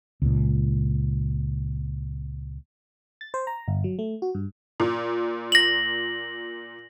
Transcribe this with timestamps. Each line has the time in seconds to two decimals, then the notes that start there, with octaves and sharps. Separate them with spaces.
0.22 C#2 A#2
3.21 A6
3.34 C5
3.47 A#5
3.68 G1
3.84 F#3
3.99 A3
4.22 F#4
4.35 G2
4.80 A#2
5.52 A#6 F#7